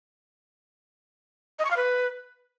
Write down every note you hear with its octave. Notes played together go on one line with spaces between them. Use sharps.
D#5
C#6
F5
B4